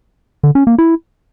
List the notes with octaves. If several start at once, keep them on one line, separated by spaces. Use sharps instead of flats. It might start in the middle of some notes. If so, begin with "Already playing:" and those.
D3
C#4
A#3
E4